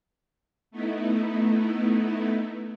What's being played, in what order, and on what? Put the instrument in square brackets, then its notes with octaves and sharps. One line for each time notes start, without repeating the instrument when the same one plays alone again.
[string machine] A3 B3 D#4 E4